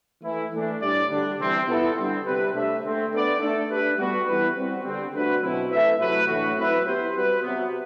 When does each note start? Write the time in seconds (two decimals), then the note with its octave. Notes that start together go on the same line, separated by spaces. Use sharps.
0.23 E3 A3 E4
0.52 E3 A3 D4
0.81 A2 G3 D4 G4 D5
1.10 D3 G3 D4
1.39 C3 E3 G3 C4
1.68 B3 E4 A4
1.97 D3 G3 C4
2.26 C3 G3 C4 G4 B4
2.54 A3 D4 G4 C5 E5
2.83 D3 A3 C4
3.12 B3 D4 A4 D5
3.40 A3 D4 A4
3.69 A3 D4 G4 B4
3.97 G3 B3 F#4
4.26 E3 G3 B3 E4 B4
4.55 G3 C4 F#4
4.84 D3 G3 C4
5.14 D3 A3 D4 F#4 B4
5.42 B2 F#3 C4 E4
5.71 A3 E4 B4 E5
5.99 C3 F#3 A3 E4 B4
6.28 A2 E3 A3 D4 F#4
6.57 F#3 C4 E4 B4 E5
6.85 B3 E4 G4 C5
7.15 G3 C4 F#4 B4
7.43 C3 F#3 B3